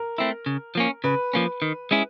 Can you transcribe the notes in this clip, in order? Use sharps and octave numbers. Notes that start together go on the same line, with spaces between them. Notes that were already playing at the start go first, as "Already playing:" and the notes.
Already playing: A#4
A3 C4 E4
C#3
F3 A#3 C#4
C#3 B4
F3 A#3 C#4
D#3
G#3 C#4 E4 G#4